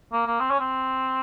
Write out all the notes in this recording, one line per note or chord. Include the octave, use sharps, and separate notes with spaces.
A#3
A#3
C4
C#4
C4